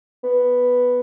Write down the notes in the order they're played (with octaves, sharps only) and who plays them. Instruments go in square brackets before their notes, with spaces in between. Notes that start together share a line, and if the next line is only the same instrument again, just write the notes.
[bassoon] B3